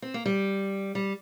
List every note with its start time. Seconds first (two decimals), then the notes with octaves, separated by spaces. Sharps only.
0.02 C4
0.14 A#3
0.26 G3
0.95 G3